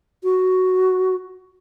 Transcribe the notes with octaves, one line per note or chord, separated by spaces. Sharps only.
F#4